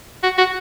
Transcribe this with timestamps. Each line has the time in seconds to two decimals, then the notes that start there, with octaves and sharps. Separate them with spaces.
0.23 F#4
0.38 F#4